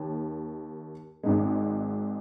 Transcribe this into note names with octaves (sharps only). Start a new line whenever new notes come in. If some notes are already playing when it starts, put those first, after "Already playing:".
Already playing: D#2 D#3
G#1 G#2 G#3